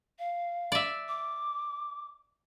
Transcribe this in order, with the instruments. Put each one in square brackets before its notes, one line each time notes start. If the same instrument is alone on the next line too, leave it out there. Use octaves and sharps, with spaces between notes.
[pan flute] F5
[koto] D5 E5
[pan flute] D6